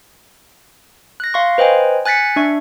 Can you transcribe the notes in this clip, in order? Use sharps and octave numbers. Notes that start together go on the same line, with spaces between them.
F#6 A#6
F5 C6 C#6
B4 C5 D#5 G5 G#5
G#5 F#6 A6 B6 C#7
D4 E5 C#6